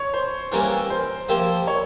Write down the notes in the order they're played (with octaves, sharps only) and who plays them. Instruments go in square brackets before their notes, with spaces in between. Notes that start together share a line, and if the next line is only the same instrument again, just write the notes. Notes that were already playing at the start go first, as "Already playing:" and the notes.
Already playing: [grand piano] C#5
C5
[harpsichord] E3 G3 A#3 C#4 E4 [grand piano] A#4
[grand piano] C5
[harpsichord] F3 A#3 E4 G4 C5
[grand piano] C#5